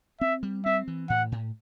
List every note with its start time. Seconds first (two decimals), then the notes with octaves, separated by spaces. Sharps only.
0.21 C4 E5
0.43 G3
0.65 C4 E5
0.88 E3
1.10 A2 F#5
1.32 A2